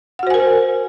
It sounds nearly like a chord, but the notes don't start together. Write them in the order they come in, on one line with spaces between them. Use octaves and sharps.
F#5 F#4 C5 G#5 A#4